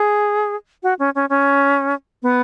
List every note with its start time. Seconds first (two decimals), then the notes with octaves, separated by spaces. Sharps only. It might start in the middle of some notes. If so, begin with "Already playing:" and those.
Already playing: G#4
0.83 F#4
0.99 C#4
1.15 C#4
1.29 C#4
2.22 B3